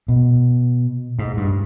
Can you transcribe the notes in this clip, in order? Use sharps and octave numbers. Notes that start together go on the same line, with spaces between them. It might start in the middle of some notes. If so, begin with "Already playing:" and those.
B2
G#2
G2